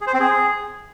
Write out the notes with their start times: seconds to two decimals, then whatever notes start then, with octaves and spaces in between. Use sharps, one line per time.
0.01 G#4
0.07 C5
0.14 C4
0.20 G#4